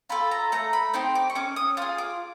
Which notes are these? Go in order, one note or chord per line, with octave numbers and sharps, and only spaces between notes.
F4 A4 B5
A#5
A3 A#5
B5
C4 D#4 G4 C6
D6
C#6
C#4 D6
D#6
F4 G#4 D#6
D6